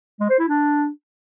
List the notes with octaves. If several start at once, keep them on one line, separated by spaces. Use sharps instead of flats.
G#3
C5
E4
D4